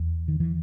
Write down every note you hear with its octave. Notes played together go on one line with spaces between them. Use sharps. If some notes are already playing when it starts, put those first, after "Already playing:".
Already playing: E2
D#3
E3